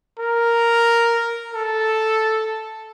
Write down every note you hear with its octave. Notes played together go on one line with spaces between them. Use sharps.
A#4
A4